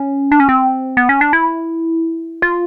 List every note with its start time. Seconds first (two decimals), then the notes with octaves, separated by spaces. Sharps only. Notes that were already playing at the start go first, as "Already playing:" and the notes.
Already playing: C#4
0.32 D4
0.40 C#4
0.49 C4
0.97 B3
1.09 C#4
1.21 D4
1.33 E4
2.42 F4